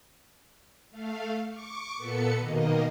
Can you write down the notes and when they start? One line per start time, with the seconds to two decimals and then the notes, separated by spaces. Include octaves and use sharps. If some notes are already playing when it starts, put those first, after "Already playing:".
0.91 A3 F5
1.50 C#6 D6
1.97 A#2 B3 A4 B4 C#7
2.36 B2 D#3 A#3 D#5